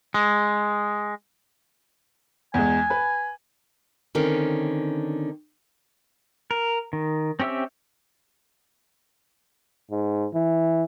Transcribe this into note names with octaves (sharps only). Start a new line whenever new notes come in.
G#3
E2 G#3 G#5
B4
D3 D#3 C4 C#4
A#4
D#3
C4 C#4 G4 E5 E6
G#2
E3